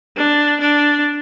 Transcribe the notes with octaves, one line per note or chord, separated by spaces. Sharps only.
D4
D4